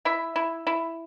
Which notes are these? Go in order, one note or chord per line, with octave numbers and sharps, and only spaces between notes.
E4 E5
E4
E4